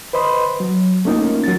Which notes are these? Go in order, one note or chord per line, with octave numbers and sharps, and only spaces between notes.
B4 C5 D#5 B5 C6
F#3
A3 A#3 C#4 D#4 F4 A#4
F#3 A6